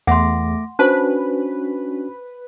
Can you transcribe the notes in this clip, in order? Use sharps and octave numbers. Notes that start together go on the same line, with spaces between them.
E2 A3 F#5 C6 D6 A#6
C#4 D4 F#4 B4 C5 A5